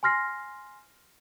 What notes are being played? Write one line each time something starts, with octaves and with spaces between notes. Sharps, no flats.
G#5 C6 F6 A#6 C7